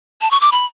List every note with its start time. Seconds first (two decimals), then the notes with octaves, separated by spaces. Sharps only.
0.21 A5
0.31 C#6
0.41 D6
0.52 B5